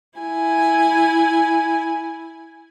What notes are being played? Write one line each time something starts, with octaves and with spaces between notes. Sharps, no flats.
E4 G#5